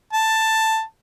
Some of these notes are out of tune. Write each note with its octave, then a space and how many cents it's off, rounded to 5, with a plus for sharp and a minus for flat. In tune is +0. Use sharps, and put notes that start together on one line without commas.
A5 +10